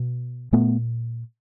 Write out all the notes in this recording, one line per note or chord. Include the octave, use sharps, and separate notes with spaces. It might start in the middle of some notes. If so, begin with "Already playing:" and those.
Already playing: B2
A#2 A3 B3